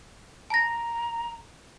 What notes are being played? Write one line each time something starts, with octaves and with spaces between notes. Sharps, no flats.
A5 A#5 A#6